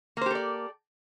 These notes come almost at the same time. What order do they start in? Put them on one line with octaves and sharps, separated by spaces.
A#3 C5 G4 A4 D5